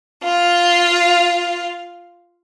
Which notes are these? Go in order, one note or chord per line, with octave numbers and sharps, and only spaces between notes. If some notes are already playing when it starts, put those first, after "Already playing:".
F4 F5